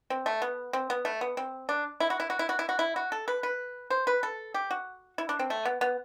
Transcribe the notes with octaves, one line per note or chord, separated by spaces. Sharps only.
C4
A3
B3
C4
B3
A3
B3
C4
D4
E4
F#4
E4
F#4
E4
F#4
E4
F#4
E4
F#4
A4
B4
B4
C5
B4
A4
G4
F#4
E4
D4
C4
A3
B3
B3